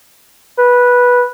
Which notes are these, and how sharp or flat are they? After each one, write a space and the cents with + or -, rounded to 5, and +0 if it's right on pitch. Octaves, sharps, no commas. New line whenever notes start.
B4 -10